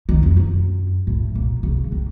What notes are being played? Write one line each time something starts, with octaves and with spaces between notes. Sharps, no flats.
D#3
F2
F#2
A2
A#2
C#3
D#3